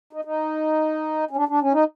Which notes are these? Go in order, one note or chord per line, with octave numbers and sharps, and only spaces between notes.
D#4
D#4
C#4
D4
D4
C#4
D#4